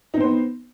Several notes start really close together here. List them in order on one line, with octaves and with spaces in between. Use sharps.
D#4 C4 C5 B3